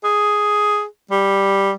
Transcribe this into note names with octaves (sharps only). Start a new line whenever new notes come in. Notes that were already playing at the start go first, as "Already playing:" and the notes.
G#4
G3